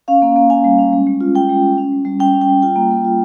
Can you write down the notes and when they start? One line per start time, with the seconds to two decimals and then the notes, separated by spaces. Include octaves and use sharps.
0.08 C#4 F5
0.22 A#3
0.36 A#3
0.50 C#4 G#5
0.64 G3
0.78 C#4
0.93 G#3
1.07 G#3
1.21 F4
1.35 F4 G5
1.49 G#3
1.63 C#4
1.78 C#4
1.92 G3
2.05 G3
2.20 C#4 G5
2.34 C#4
2.41 G5
2.49 G3
2.62 F4 G5
2.76 A#3
2.91 A#3
3.04 F4